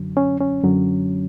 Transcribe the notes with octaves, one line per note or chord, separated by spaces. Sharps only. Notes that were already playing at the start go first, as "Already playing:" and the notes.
Already playing: F#2 D3 F#3
C#4
C#4
F#2 D3 F#3